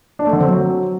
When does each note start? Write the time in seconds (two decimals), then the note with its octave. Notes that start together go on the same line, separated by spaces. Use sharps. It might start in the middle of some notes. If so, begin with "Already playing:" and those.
0.19 D4
0.26 A3
0.33 D3
0.40 C4
0.47 F#3